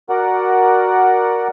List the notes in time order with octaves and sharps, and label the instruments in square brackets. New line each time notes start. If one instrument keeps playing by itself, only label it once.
[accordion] F#4 A#4 D5 F#5